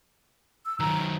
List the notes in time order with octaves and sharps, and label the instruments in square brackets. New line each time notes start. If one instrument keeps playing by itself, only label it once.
[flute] E6
[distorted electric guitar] D#3 F#3 [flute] A#5